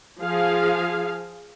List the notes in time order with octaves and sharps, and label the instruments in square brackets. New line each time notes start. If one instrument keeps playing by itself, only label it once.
[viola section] F3 G#4 F5